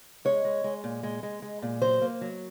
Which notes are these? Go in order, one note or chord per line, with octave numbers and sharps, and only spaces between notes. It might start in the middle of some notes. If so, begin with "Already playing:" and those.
G#3 C#5
G#3
G#3
A#2
G#3
G#3
G#3
A#2
F#3 C5
A#3
F#3